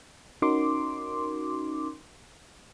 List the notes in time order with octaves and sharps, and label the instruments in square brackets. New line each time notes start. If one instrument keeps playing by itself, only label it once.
[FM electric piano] C#4 D#4 F#4 A#4 C6 D6